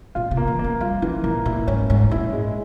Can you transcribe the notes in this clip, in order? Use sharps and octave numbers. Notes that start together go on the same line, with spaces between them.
A#2 F4
C3
A#3
E3
F3 A#3
G3 F4
E3 F3
A#2 A#3
A#2 E4
G#2 C#4
G#2 C#4
A#2 E4
G#3